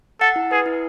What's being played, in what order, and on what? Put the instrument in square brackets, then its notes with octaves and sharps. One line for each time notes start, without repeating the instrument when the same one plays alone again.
[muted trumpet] A4 [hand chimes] F#5
[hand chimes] E4
[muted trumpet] G#4 [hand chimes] B4
[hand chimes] E4